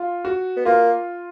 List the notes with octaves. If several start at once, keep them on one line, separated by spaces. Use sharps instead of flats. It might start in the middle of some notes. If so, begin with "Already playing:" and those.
Already playing: F4
F#4
B3
A#3 F4